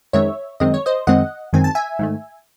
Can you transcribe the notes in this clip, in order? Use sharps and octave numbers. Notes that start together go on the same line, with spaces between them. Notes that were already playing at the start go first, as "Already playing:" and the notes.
F#2 D#3 G#3 C4 C#5 E5
F#2 D#3 G#3 C4 D#5
C#5
C5 D#5
F#2 D#3 G#3 C4 D#5 F#5
F#2 D#3 G#3 C4 G#5
A5
E5 G#5
G#2 D#3 A3